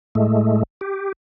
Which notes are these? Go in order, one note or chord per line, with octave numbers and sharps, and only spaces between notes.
A2 G#3 A3
G4